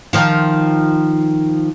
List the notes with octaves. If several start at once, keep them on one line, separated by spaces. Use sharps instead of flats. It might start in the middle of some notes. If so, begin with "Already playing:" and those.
D#3 F3 F4